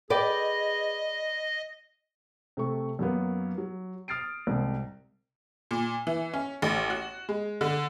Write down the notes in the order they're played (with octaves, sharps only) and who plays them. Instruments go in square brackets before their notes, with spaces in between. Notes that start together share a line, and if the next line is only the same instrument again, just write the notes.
[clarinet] G#4 [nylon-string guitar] B4 D5 G5 [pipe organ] D#5
[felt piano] C3 A3 C#6
F#2 F#3 A#3 B3
F#3
D#6 F6 A6 C7 D7
C2 G#2 C3
[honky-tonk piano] A#2
E3
C#4
A1
F#4
G#3
D3